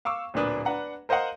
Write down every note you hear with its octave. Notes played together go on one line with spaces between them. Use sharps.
F5 C#6 D6 E6
D1 A#2 A#3 D4 B4 D#6
D4 B4 F#5 A#5
A#4 C5 D#5 F5 F#5 C6